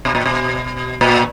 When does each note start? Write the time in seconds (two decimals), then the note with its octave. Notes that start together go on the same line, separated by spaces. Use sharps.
0.05 B2
0.15 A#2
0.26 B2
1.01 A#2